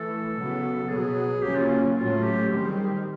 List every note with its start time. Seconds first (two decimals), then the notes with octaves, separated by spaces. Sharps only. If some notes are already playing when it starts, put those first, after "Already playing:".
Already playing: E3 A3 A4
0.35 C#3 F#3 B3
0.89 B2 F#3 B3 G#4
1.42 C#3 F#3 A#3 C#4 G4
1.56 F4
1.69 F4
1.96 A2 F#3 A3 C#4 F4
2.23 G4
2.49 D#3 G3 C4 G4
2.67 G#4
2.85 G4